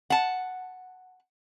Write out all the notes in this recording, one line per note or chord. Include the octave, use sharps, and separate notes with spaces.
F#5 A5